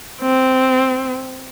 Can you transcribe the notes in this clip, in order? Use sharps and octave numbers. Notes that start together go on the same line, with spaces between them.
C4